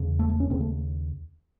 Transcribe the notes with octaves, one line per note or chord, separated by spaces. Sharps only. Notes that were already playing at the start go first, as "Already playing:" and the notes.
Already playing: E2 C#3
A3
A3
C#4
D#2 C#3 C4
A3